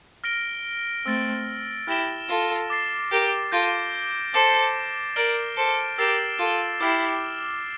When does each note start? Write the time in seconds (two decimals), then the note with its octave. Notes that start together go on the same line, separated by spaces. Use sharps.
0.24 F6 A#6 D7 G7
1.06 A3 C4 E6 A6 D7
1.87 E4 G4 F6 A#6 E7 G7
2.29 F4 A4
2.70 D6 A6 C7
3.11 G4 A#4
3.52 F4 A4 G6 A#6 D7 G7
4.34 A4 C5 D6 A6 C7 E7
5.16 A#4 D5 F6 A6 D7 G7
5.57 A4 C5
5.98 G4 A#4 E6 A6 C7 E7 G7
6.39 F4 A4
6.80 E4 G4 D6 F6 C7